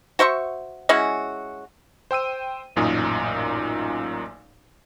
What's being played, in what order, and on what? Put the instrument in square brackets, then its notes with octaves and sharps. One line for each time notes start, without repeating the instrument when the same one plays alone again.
[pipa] F#4 C5 E5 C#6
G#3 C#4 E4 F#4
[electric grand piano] C5 G5 E6 D#7
A1 F#2 A#2 D#4 D#6